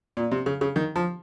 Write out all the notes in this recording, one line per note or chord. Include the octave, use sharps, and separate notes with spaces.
A#2
C3
C#3
C#3
D#3
F3